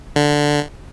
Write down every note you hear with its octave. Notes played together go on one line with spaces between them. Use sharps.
D3